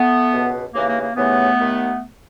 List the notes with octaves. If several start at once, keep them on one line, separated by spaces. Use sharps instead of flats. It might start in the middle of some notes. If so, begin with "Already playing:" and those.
Already playing: A3 B3
C#2 B2
D#2 C#3 E3 A#3
A#3
A#3
D#2 C#3 E3 A3 B3
D#2 D#3